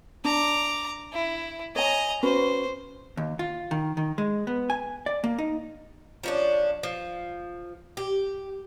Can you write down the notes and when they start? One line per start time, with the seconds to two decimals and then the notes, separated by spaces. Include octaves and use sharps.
0.25 D4 A#5 D6
1.13 E4
1.76 C#5 D#5 G#5 A#5
2.23 C#4 F#4 B4 C5
3.17 D#2
3.39 F4
3.71 D#3
3.97 D#3
4.18 G#3
4.47 B3
4.70 G#5
5.06 D5
5.24 A#3
5.38 D#4
6.23 F3 C#4 D4
6.83 F3
7.97 G4